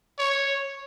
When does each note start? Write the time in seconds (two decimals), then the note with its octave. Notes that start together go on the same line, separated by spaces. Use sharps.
0.18 C#5